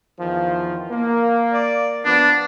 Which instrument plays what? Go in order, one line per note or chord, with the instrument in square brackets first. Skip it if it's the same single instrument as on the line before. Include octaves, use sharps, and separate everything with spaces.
[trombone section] E2 D#3 F3
A#3
[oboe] D5
[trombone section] F3 B3 [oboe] D4